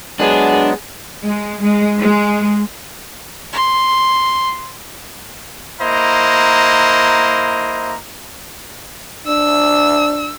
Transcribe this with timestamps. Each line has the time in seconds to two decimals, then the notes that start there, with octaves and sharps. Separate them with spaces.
0.20 F#3 G#3 B3 D4 G#4
1.25 G#3
1.61 G#3
1.99 G#3
3.52 C6
5.81 A#3 E4 C5 D#5 A#5
9.27 D4 E6